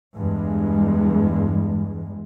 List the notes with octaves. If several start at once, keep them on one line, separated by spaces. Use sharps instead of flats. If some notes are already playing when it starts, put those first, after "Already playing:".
E2 G2 G#3